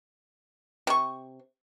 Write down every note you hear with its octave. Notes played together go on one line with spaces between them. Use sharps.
C3 C#6